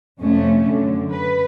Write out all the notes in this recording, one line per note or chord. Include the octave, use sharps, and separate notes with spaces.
F2 C3 A3 C#4
F#2 D3
B4